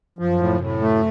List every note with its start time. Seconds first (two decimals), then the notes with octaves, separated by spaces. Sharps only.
0.18 F#2 F3
0.40 A2
0.51 C3
0.61 A2
0.82 A3